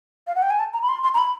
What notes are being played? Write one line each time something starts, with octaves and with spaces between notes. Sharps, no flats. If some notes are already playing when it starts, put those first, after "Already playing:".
F5
F#5
G5
G#5
A5
A#5
B5
C6
C6
A#5
B5